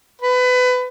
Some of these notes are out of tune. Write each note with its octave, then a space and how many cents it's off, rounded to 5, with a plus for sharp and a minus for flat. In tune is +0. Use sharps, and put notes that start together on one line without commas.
B4 +25